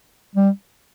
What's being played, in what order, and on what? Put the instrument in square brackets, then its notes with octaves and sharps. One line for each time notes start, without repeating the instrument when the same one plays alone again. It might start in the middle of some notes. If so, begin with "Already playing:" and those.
[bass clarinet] G3